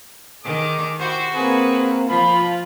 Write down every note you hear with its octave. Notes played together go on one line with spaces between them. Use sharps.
D#3 D#4 G#4 D6
E4 F#4 G4 C5
A#3 C4 G#4 B4
F3 F4 B5